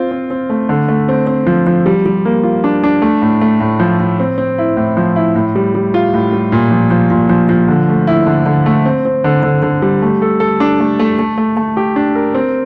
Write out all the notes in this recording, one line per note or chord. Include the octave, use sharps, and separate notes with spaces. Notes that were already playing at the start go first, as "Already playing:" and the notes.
Already playing: C4 F4
C4
C4
A3
D3
A3
C4
C4
F3
F3
G3
G3
A#3
F4
D4
D4
A3
A2
A3
A2
F3
A2
C4
C4
E4
A2
F3
E4
A2
G3
G3
F4
A2
G3
A#2
F3
F3
A#2
F3
F3
D3
A3
E4
D3
D3
A3
C4
C4
D3
D3
D3
G3
A3
A4
A4
D4
A3
A3
A3
A3
A3
G4
D4
A#4
C4